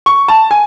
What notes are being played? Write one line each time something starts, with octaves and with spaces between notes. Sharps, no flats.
C#6
A5
G#5